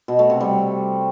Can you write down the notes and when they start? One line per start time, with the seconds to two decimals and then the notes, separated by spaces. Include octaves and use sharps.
0.08 B2
0.19 A3
0.30 C3
0.40 G3